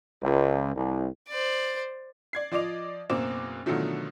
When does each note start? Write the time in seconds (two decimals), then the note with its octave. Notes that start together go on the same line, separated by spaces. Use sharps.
0.23 C#2
0.76 C2
1.29 C5 D5
2.33 D5 G#6 C7
2.52 F3 D5 D#5 D6 F7
3.10 F#1 B2 A#3 C4 D6 E7
3.66 B2 D3 D#3 F3 F#3 A3